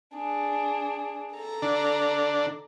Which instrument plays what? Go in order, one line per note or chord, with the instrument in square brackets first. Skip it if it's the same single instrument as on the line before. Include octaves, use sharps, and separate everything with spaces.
[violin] D4 G#4
A4 A#5
[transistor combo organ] D3 D4